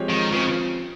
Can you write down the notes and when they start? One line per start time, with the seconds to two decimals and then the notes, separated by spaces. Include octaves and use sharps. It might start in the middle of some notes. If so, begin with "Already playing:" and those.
Already playing: F3 G#3 C4 G4 C#5
0.09 D#3
0.32 C#3 F3 C4 F4